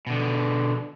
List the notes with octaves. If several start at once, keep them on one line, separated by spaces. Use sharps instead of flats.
B2 D3